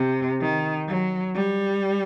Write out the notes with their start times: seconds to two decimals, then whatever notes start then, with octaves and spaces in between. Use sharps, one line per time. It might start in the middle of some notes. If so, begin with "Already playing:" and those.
Already playing: C3
0.41 D#3
0.88 F#3
1.35 G3